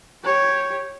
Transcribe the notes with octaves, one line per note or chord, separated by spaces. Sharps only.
G4 C#5